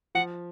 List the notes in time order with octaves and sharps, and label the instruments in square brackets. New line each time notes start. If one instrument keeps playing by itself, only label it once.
[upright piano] F3 [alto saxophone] F#5